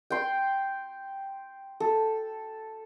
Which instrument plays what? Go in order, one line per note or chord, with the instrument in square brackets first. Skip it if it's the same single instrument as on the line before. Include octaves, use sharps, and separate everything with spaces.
[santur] G5 C6
A4